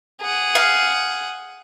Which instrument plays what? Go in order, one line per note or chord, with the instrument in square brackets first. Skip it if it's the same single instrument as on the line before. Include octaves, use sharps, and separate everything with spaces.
[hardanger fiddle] G#4 F#5
[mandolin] F5